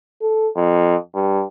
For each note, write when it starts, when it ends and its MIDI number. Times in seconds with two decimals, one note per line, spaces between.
0.22 0.49 69
0.56 0.96 41
1.15 1.43 43